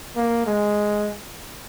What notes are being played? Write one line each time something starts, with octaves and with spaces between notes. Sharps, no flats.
A#3
G#3